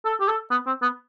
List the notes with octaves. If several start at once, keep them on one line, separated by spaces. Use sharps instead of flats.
A4
G4
A4
B3
C4
B3